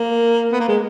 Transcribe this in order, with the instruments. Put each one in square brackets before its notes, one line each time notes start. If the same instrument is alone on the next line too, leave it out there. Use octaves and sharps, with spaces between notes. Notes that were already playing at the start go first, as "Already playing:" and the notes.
Already playing: [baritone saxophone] A#3
B3
A#3
G#3